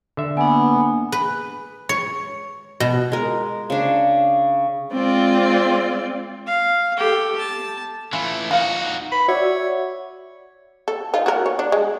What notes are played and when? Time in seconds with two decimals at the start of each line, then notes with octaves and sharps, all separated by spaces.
0.17 D3 E5
0.37 A#3 B3 D4 G#5
1.12 B4
1.89 C#5
2.80 B2
3.12 G#3 A#4
3.70 C#3 D4
4.91 G#3 C4 F4 D5
6.47 F5
6.97 G4 A4
7.38 A5
8.13 E3 A3 C#4 E4 F4
8.51 D#4 F4 F#4 F5
9.12 B5
9.28 F#4 C#5 D5 E5
10.88 A4
11.14 D#4 F4
11.26 F#4 A#4
11.46 C#5
11.59 D4
11.72 G#3